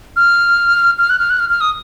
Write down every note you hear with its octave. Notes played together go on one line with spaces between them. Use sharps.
F6
F6
F#6
F6
F#6
F6
F6
D#6